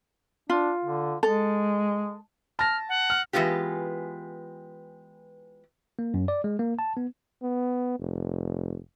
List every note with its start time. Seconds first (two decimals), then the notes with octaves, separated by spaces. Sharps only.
0.50 D4 F4
0.84 D3
1.23 G#3 A4
2.59 A5 F6 A#6
2.89 F#5
3.10 F6
3.33 E3 G#3 B3 F4 G4
5.99 A#3
6.14 F#2
6.28 D5
6.44 G#3
6.59 A#3
6.79 A5
6.97 B3
7.43 B3
7.99 F1